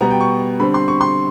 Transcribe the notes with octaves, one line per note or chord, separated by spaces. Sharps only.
B2 G3 B3 A#5
G5
C#6
D3 G3 C4 B5
C6
C#6
C6